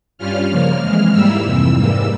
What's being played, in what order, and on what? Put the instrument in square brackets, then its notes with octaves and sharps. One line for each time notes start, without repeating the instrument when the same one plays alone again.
[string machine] G2 G3 C#4 F4 F6
C#3 F3 A#3
F2 E3 G#3
G#2 G3 A#3 E4 E6
F2 C3 E3
G#2 E3 G3 A#3 E6